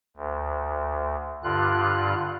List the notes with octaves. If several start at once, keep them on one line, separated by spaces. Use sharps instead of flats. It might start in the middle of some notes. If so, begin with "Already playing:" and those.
D2
G2 D3 F4 F#6